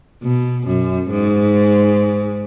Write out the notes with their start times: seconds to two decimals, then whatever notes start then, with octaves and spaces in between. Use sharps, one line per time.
0.23 B2
0.67 F#2
1.10 G#2